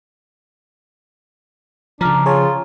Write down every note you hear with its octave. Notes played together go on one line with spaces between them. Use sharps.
C#3 F3 D4 A#5 F6
F4 G#4 C#5 A5